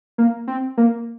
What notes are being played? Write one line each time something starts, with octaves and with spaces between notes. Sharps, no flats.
A#3
C4
A#3